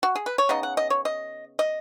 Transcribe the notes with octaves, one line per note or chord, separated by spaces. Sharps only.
F#4
G#4
B4
C#5
C#3 B3 D#4 D#5
F#5
D#5
C#5
D#5
D#5